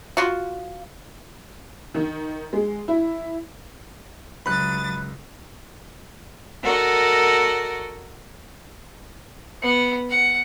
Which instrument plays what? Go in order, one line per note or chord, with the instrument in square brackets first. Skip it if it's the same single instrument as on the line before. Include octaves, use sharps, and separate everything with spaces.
[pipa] F4 F#4
[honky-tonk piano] D#3
G#3
E4
[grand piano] C#2 [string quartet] F#3 D#6 A6 [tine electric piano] B5 F#6
[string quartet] F#4 A4 A#4 D5 D#5
[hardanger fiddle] B3
F#5